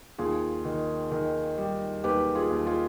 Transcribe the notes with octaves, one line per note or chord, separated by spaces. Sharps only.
D#2 F4 G#4
D#3
D#3
G3
D#2 G4 B4
F4 G#4
D#2
F4 G#4